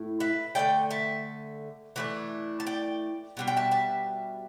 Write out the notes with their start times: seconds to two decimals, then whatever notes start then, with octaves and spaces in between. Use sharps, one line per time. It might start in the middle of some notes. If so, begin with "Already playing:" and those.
Already playing: A2 A3 E4
0.20 B4 E5
0.55 D3 A3 E4 D5 G5
0.91 E5 A5
1.96 E3 A3 D4
2.60 A5
2.66 D5 G5
3.37 B2 G3 D4
3.48 G5
3.57 E5 A5
3.71 E5 A5